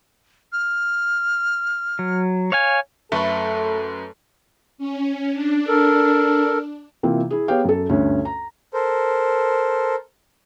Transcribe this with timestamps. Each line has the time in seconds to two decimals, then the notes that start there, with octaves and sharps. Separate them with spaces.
0.53 F6
1.99 F#3
2.52 C#5 F5 G#5
3.12 F#2 A3 A4 B4 B5
4.78 C#4
5.32 D4
5.67 A4 A#4
7.03 C3 E3 A#3 C4 F4
7.31 E4 G#4
7.48 B3 G4 G#4 C#5 F5 G5
7.64 F#2 A4
7.89 D2 G2 C#4
8.25 A#5
8.74 A4 A#4 C5